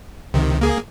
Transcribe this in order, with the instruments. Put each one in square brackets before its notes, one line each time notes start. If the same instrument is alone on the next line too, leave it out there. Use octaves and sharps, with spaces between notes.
[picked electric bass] C#2 [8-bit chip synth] C3 D#3
[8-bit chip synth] A#3 G#4